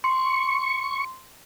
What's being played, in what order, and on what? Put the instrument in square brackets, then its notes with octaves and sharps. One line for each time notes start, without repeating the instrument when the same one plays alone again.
[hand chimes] C6 [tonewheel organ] C#6